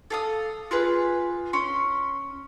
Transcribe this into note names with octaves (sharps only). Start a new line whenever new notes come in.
A4 F5 D#6
F4 G#4 B4
C#4 C6